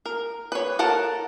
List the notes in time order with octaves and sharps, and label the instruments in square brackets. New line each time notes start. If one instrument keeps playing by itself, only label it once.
[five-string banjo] A#4
B4 C#5
A4 A#4 F#5 A5